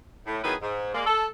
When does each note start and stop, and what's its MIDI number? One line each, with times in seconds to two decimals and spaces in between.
0.27 0.40 45
0.44 0.55 51
0.44 0.55 54
0.44 0.55 59
0.44 0.55 64
0.44 0.55 68
0.44 0.55 71
0.62 0.94 44
0.95 1.06 56
0.95 1.06 58
0.95 1.06 74
1.06 1.27 69